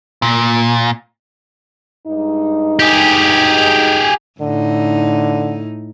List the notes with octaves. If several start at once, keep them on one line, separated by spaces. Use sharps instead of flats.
A#2
G2 G#3 D#4
G4 G#4
A2 D3 D#4